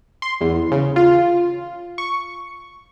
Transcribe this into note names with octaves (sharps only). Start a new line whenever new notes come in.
C6
E2
C#3
F4
C#6